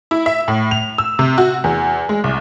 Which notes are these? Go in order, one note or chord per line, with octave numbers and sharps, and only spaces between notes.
E4
E5
A2
F7
E6
C3
F#4
E2
G#3
C2